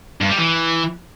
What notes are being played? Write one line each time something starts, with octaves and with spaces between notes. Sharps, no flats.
G2
G3
E3